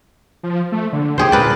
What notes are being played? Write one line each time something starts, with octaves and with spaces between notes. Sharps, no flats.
F3
A3
D3
D#2 G4 G#4 C5
A#2 A#4 B4 D5